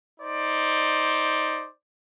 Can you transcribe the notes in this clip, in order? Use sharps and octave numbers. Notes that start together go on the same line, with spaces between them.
D#4 C5 D5